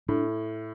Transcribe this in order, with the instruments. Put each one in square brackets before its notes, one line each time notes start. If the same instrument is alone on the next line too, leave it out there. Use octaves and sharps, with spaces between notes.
[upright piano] A2 [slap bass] D4